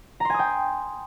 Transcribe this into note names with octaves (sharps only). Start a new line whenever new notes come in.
G5 G#5 A#5 C6 D#6